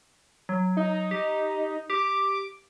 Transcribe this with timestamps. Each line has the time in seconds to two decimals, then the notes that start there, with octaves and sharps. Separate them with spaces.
0.49 F#3
0.77 D#4
1.11 G4
1.90 G4 D6